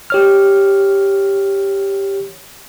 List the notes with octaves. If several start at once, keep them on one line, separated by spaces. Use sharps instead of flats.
G4 C#5 F6